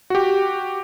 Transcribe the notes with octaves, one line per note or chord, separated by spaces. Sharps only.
F#4 G4